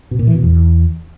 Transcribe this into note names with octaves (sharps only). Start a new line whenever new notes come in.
B2
A#2
E3
B2
E2